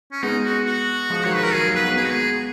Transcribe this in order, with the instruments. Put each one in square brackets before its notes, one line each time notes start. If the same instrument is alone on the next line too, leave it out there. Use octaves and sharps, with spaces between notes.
[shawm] C#4
[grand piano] G#3 B3 [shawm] D#4
[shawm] F#4
F#4
[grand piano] F3 G#3
[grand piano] D#3 F#3 [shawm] C#5
[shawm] B4
[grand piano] D#3 F#3 [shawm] A#4
[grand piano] D#3 F#3 [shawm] G#4
[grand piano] F#3 A#3
[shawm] B4
[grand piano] G#3 B3
[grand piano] G#3 B3 [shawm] G#4
[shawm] F#4
G#4